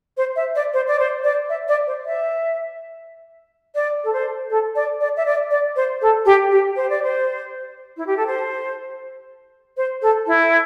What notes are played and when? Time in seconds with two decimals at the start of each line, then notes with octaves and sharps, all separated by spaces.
0.17 C5
0.35 E5
0.55 D5
0.73 C5
0.87 D5
0.99 C5
1.23 D5
1.49 E5
1.68 D5
1.86 C5
2.05 E5
3.74 D5
4.04 A4
4.12 C5
4.50 A4
4.75 D5
5.00 D5
5.16 E5
5.25 D5
5.50 D5
5.75 C5
6.01 A4
6.25 G4
6.51 G4
6.76 C5
6.89 D5
7.02 C5
7.96 E4
8.06 G4
8.16 A4
8.26 C5
9.76 C5
10.01 A4
10.26 E4